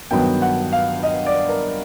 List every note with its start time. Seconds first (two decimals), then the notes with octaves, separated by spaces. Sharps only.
0.11 G2 D#3 F#3 B3 G5
0.42 F#5
0.73 F5
1.03 D#5
1.27 D5
1.49 A#4